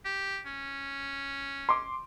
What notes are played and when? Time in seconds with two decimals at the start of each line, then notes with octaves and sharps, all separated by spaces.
0.05 G4
0.46 C#4
1.69 C6 D6